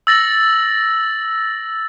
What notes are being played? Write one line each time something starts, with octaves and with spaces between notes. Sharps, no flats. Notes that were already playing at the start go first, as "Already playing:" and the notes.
E6 A6 A#6 F#7